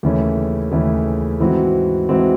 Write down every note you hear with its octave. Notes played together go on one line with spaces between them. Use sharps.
D#2 C#3 E3 A3 C#4
D#2 C#3 E3 A3 C#4
G#2 E3 C4 F#4
G#2 E3 C4 F#4